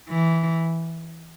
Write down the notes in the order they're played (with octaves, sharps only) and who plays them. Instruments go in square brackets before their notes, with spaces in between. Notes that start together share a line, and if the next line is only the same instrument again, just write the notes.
[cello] E3